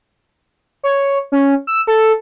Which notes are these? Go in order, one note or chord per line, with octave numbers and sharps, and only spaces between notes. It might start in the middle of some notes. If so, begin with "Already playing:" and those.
C#5
C#4
E6
A4